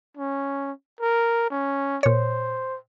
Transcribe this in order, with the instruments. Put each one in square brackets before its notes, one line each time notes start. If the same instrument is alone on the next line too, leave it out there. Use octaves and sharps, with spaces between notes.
[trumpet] C#4
A#4
C#4
[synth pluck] A#2 C#5 [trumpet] C5